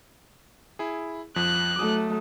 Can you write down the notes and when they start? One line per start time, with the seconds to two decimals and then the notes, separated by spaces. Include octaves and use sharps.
0.79 E4 G#4
1.36 F2 F3 F#6
1.76 F#3 A3 D6 D#6